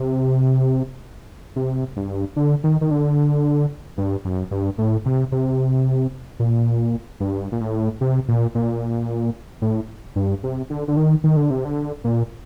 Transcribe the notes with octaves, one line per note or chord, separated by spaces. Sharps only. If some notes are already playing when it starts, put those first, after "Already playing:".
Already playing: C3
C3
G2
D3
D#3
D#3
D3
G2
F#2
G2
A2
C3
C3
A#2
G2
A#2
A2
C3
A#2
A#2
A2
G2
C3
D3
D3
D#3
D#3
D3
C3
D3
A#2